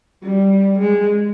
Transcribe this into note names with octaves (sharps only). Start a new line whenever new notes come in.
G3
G#3